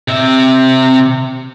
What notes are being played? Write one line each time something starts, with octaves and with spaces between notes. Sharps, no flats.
C3 E5